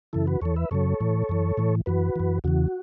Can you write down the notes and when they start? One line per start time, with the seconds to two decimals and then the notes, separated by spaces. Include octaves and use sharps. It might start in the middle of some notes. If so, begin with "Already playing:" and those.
0.13 F#2 C#3 E3 E4 A4
0.27 F#4 B4
0.42 E2 E3 A4 C#5
0.56 B4 E5
0.71 F#2 C#3 F#3 A4 C#5
1.00 A2 E3
1.29 F#2 E3
1.57 A2 E3
1.86 F#2 E3 F#4 B4
2.16 F#2 E3
2.44 E2 C#3 E3 F#4